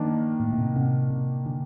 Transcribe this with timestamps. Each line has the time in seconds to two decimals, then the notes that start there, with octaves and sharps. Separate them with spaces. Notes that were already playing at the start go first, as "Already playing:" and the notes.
Already playing: D#3 F3 A#3 D4
0.40 A2
0.52 A#2
0.59 C3
0.76 C3
1.10 C3
1.46 D3